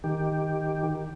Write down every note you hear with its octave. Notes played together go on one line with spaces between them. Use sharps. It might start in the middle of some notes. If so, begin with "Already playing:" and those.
D#3 G4